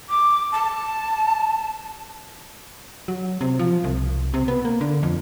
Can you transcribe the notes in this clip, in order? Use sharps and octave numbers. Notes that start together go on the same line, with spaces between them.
D6
A5
F#3
C3
F3
C2
C3
B3
A#3
D3
F2